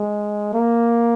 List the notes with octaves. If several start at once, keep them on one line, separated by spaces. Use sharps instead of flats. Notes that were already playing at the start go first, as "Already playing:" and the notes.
Already playing: G#3
A#3